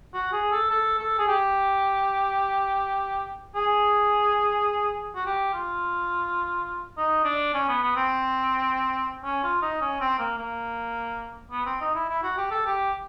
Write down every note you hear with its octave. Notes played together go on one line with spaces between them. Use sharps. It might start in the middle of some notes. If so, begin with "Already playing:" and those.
F#4
G#4
A4
A4
A4
G#4
G4
G#4
F#4
G4
F4
D#4
D4
C#4
B3
B3
C4
C#4
F4
D#4
C#4
C4
A#3
A#3
B3
C4
D#4
E4
E4
F#4
G4
A4
G4